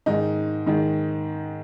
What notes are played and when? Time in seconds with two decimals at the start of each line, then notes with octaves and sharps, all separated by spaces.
0.06 G#2 D#3 D#4
0.66 G#2 D#3